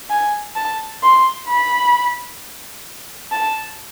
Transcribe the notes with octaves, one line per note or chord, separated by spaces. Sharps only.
G#5
A5
C6
B5
A5